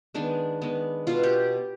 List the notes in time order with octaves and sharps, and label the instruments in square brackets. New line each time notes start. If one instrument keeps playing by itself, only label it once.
[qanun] D#3 G#3 B3 D4
D#3 G#3 B3
B2 B3 F4
G4